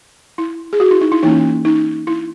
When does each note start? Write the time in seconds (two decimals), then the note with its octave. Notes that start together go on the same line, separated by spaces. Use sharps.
0.38 E4
0.73 G#4
0.80 F#4
0.91 E4
1.01 D#4
1.12 E4
1.23 E3 A#3 C#4 D#4
1.65 D#4
2.07 E4